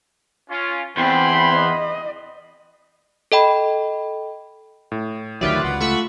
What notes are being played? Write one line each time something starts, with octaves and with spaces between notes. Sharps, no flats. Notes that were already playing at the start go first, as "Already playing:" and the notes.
C#4 F4
E2 C4 G5 B5 C6
D#5
A4 D#5 G5 B5
A2
D2 D#3 F#3 F4 G4 B4 D5 E5
C#2 F#5
A3 F4 B5 C#6 E6